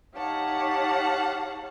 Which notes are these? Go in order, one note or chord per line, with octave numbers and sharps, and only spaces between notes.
D#4 G4 C#5 F5 F#5 A5